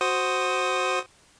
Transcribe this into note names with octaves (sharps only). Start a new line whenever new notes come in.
F#4 C5 D#6